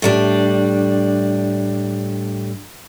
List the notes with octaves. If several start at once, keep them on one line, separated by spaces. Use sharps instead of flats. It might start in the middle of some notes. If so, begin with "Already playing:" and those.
A2 G3 D4